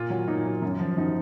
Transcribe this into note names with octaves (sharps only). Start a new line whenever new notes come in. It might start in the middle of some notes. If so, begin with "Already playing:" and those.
Already playing: A#2 F4
F#3
A#2 D#4
F#3
F#2
F3
F#2 D#4